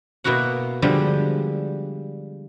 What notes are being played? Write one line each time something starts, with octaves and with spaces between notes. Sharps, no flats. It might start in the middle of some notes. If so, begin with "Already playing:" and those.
B2 A#3 E4 F#4 F#5
D3 F3 G3 G#3